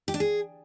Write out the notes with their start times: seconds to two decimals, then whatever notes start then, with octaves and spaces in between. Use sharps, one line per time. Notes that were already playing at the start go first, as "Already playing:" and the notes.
0.08 G4
0.14 D4
0.20 G#4